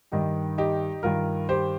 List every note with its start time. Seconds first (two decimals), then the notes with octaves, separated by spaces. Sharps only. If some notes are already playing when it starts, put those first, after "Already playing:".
0.12 G2 D#3 D#4 G4
0.58 D#4 G4
1.03 G2 D#3 F4 A#4
1.49 G4 C5